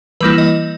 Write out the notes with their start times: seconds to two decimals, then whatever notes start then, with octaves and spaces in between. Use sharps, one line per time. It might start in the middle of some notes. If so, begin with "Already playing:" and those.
0.21 E3 G3 A#3 E4 B4
0.38 D#5